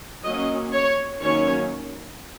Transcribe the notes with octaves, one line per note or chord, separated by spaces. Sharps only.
F#3 A#3 C#4 D#5
C#5
D#3 F#3 A#3 C#4 C#5